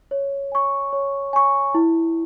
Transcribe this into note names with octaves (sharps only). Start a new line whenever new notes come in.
C#5
G#5 C#6
C#5
G#5 C#6
E4